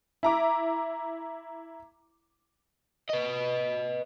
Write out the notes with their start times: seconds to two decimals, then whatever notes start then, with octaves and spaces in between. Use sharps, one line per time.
0.23 E4 A#5 D6
3.10 B4 D#5